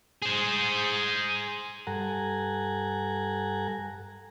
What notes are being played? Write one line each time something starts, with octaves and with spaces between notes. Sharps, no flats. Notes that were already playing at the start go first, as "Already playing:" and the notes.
G#4 C5
G2 A4 F#5 G#5 A#5